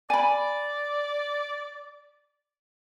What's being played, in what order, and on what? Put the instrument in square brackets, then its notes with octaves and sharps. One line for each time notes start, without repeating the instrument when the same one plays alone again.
[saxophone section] D5 [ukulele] G#5 B5